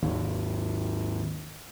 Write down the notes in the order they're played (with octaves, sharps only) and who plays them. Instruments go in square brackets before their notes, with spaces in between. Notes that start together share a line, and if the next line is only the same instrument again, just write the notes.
[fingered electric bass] G#1 D#2